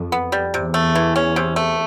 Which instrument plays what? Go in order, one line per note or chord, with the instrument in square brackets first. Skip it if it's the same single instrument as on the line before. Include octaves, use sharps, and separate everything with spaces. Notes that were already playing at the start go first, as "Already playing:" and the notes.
Already playing: [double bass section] F2
[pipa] B3
G3
[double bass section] E2 [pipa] C3
[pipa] A3
E3
C#4
C3
A3